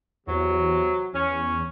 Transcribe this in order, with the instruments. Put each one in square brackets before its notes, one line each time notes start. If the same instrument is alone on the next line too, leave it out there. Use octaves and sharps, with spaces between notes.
[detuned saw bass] E2 [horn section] C3 F#3
[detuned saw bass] E2 [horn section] C#4